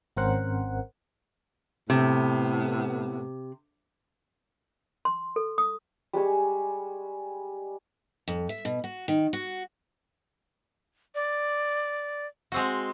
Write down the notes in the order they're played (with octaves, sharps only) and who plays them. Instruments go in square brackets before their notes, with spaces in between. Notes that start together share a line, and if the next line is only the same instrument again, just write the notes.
[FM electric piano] G#1 C4 C#4 A#4 C5 F#5
[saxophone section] A2 B3 [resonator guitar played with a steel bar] C3
[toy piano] C6
A4
D#6
[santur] G3 G#3 G#5 C#6
[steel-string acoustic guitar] F2
E5
B2
F#4
D#3
F#4
[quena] D5
[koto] G#3 C4 F#4